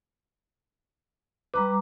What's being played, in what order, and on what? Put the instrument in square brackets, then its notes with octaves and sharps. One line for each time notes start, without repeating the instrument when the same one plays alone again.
[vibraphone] G3 A#5 D6 [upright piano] B4